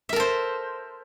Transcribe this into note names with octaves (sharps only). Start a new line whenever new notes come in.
A4 A#4 C5 E5